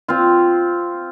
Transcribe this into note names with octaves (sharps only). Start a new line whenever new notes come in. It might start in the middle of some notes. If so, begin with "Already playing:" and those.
C4 F4